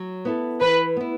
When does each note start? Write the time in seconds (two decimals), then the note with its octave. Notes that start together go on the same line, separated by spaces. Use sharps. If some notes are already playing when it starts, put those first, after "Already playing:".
Already playing: F#3
0.25 B3 E4 A4
0.61 E3 B4
0.97 B3 E4